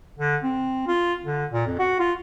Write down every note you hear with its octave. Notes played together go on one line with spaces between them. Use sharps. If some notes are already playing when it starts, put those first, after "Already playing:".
D3
C4
F4
D3
A#2
F2
F#4
F4